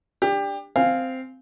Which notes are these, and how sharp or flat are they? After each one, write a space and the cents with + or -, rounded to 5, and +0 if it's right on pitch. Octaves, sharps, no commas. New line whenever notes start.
D4 +0 G4 +25
C4 -10 F5 +0 G#5 -5